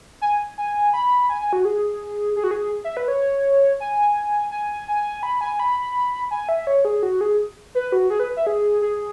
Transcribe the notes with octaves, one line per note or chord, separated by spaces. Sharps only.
G#5
G#5
B5
G#5
G#5
F#4
G#4
G#4
F#4
G#4
E5
B4
C#5
G#5
G#5
G#5
B5
G#5
B5
G#5
E5
C#5
G#4
F#4
G#4
B4
F#4
G#4
B4
E5
G#4
G#4